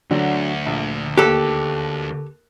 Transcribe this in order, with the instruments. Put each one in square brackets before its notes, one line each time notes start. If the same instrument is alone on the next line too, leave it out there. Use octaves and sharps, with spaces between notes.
[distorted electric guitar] D2 [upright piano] D3 F#3 D4
[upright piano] A#1
[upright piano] D#2 F#6 [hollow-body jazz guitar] G4 A4